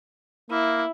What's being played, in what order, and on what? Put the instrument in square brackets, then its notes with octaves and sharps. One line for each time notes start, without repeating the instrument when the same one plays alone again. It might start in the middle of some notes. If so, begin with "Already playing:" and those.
[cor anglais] A#3 [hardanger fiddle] E4